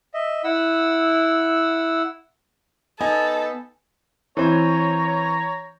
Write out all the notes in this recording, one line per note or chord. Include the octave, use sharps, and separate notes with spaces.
D#5 E5
E4 F#5 E6
B3 D#4 A4 G#5
E3 C4 C5 C#5 A#5